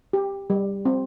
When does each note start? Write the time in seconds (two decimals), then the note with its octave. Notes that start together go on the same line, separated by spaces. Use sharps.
0.13 G4
0.50 G3
0.85 C4